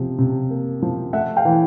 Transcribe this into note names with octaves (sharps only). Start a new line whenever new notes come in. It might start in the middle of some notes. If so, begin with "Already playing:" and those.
Already playing: C3 F3
C3
A#3
F3
A3 E5 F#5
F5 G5
E3